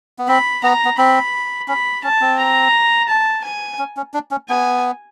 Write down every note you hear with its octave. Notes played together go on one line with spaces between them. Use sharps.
B3
C4 B5
B3 A#5
B3
C4 B5
C#4 B5
C#4 A5
C4
A#5
A5
G#5
C#4
C#4
D4
C#4
B3 G#5